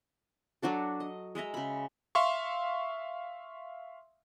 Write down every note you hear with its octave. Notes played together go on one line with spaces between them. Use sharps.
F#3 D4 F#4 A4
D#5
G#3 D#5 E5 A#5
C#3 B5
E5 F5 C6 C#6